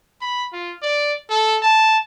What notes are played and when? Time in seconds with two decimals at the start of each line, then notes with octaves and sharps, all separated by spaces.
0.21 B5
0.53 F4
0.82 D5
1.30 A4
1.62 A5